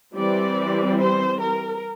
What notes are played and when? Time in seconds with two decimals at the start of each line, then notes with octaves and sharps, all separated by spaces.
0.14 E3 G3 C4 D5
0.99 C5
1.41 A#4